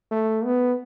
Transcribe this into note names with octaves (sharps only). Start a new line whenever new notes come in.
A3
B3